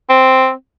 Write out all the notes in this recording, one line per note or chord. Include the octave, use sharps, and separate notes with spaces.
C4